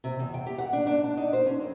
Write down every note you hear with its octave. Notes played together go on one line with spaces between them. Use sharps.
C3
E2
G5
G4
F#5
D4
D4
D4
D#4
C5
C#4
F2